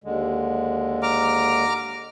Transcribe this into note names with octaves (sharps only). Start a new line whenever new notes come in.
D#2 D3 G#3
A#5 D6 F6